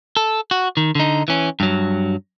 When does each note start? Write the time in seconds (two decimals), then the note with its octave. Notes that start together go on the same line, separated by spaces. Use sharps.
0.17 A4
0.51 F#4
0.77 D#3
0.95 D3 D#4
1.28 E3 C#4
1.60 G2 F#3